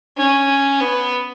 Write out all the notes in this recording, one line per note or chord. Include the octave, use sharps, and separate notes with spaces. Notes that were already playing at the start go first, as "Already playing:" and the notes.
C#4
B3